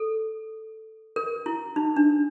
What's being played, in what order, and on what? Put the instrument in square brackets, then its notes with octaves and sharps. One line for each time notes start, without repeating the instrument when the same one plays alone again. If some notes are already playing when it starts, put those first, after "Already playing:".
Already playing: [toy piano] A4
A#4
E4
D#4
D4